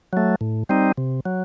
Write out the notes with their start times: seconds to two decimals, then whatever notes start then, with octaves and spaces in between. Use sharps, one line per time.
0.13 F#3 A3
0.41 A2
0.69 G3 C4 D#4
0.98 C3
1.26 F#3